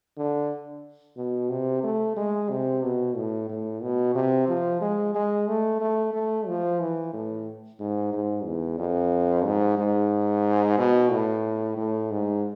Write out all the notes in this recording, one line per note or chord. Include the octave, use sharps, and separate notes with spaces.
D3
B2
C3
A3
G#3
C3
B2
A2
A2
B2
C3
F3
G#3
G#3
A3
A3
A3
F3
E3
A2
G#2
G#2
E2
F2
G#2
G#2
B2
A2
A2
G#2